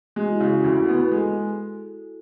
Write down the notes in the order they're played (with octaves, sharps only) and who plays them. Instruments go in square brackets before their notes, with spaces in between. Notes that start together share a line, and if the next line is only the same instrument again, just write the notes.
[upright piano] G#3 [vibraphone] F#4
[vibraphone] E4
[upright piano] C#3 [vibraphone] F#4
[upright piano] D2
B3
[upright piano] G#3 [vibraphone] A4